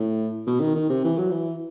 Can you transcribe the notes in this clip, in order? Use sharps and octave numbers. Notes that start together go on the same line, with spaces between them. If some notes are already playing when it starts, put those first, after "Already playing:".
Already playing: A2
B2
D#3
D#3
C3
E3
F#3
E3